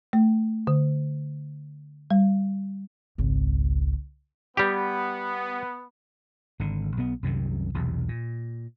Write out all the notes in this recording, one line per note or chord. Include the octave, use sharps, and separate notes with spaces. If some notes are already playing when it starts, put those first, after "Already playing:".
A3
D3
G3
G#1 C#2
G3 B3 G4
G#1 D3
B1 B2 B3
C2 F#2 C3 D#3
B1 E2 C3
A#2